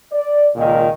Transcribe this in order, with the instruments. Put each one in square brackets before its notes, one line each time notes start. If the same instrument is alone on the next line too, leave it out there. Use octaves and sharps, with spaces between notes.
[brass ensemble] D5
C#2 A#2 D#3